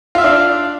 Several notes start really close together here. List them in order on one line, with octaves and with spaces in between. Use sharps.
F4 E5 F5 D4